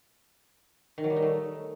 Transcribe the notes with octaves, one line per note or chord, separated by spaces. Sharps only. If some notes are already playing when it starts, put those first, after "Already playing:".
D#3
F#3
G3
D#4
A3